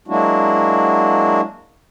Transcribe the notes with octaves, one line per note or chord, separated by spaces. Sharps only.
F#3 G#3 A#3 D4 E4 F#4